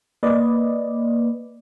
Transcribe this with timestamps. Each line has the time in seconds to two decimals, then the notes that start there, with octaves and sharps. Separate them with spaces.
0.23 A#3 B4 D5 D#5